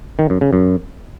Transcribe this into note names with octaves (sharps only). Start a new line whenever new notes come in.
D#3
F#2
C#3
F#2